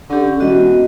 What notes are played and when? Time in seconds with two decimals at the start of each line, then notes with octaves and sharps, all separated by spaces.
0.10 D3 C#4 G4
0.40 E1 F#4 D#5